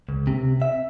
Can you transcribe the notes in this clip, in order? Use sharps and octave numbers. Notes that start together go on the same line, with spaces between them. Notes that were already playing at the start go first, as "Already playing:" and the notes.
C#2
C3
E5